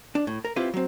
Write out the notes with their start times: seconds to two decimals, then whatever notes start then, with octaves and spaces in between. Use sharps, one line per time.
0.15 D4
0.27 A2
0.45 A#4
0.56 C4 E4 F4 G4 B4
0.74 F#3 C4